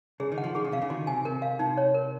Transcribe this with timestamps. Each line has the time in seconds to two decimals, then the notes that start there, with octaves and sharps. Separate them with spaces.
0.20 C#3 G#4
0.32 D#3
0.38 F#5
0.44 F3
0.55 D#3 G#4
0.65 C#3
0.72 C3 F5
0.82 C#3
0.90 D#3 F#4
1.07 C3 G#5
1.25 C3 A#4
1.42 F5
1.59 C3 D#4
1.77 C#5
1.94 A#4